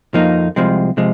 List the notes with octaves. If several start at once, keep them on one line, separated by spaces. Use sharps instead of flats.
F2 F3 A#3 D#4
C2 C3 F3 G#3
C3 F3 G#3